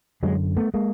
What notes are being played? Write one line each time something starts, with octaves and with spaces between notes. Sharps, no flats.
F#2 D3 F#3 G#3
A3 B3
G#3 A#3